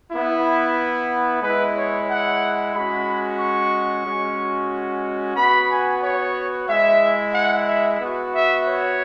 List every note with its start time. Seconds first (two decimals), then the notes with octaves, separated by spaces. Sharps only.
0.10 B3 E4
1.42 G#3 E4 B4
1.75 C#5
2.08 F#5
2.73 G#3 C#4 F#4 B5
3.40 C#6
4.05 G#3 C#4 F#4
5.36 B3 F#4 B5
5.70 G#5
6.02 C#5
6.68 G#3 E4 E5
7.34 F#5
7.67 E5
8.00 B3 F#4
8.33 E5
8.65 C#5